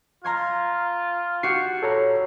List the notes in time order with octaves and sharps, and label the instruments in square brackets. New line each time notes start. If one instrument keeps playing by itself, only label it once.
[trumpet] F4 [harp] A#5 C6 G#6
[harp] F#4 G4 F#5 [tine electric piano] C7
[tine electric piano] A4 C#5 A#5